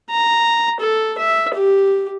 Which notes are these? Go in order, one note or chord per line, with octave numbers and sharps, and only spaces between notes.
A#5
A4
E5
G4